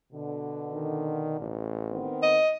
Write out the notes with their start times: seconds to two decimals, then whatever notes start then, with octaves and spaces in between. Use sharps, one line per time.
0.13 B2 D3
0.72 D#3
1.40 A1
1.91 D#3 B3 C4
2.23 D#5